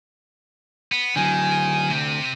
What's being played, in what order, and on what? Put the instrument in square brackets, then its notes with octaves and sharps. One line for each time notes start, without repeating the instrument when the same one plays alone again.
[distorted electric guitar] B3
[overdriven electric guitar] D3 F#3 [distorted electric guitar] D#3 [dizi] G#5
[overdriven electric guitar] D2 [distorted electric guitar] C3 C4